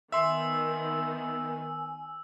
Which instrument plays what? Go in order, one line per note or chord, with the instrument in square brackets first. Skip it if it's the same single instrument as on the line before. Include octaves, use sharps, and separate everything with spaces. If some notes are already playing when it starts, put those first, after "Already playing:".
[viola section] D#3 B3 [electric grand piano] E5 C6 [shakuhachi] G#5 [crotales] E6